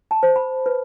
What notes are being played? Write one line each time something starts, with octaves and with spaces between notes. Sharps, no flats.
A5
C5
B5
B4